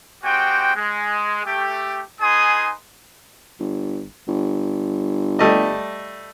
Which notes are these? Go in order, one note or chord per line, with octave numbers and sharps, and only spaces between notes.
G#3 C4 F#4 G4 G5
G#3
A3 G4
D#4 G#4 B4 G#5 C6 D#6
G1
G1
G3 A3 D#5